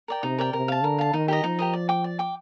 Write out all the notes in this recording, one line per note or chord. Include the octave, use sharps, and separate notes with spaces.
A#4 D5 G5
C3 D#4
A#4 D5 G5
C3 A#4
F5 A5
D3 A#4
F5 A5
D#3 D#4
G4 A#4 D#5
F3 D#4
G4 A#4 D#5
D5
G5 D6
D5
G5 D6